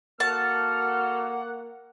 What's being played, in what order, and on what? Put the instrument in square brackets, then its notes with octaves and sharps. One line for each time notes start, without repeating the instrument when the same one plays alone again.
[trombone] A#3 [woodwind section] F#4 A4 F6 [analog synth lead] F#5 [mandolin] A5